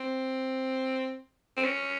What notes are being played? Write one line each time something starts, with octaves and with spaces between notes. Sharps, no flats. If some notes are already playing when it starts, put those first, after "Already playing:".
Already playing: C4
C4
C#4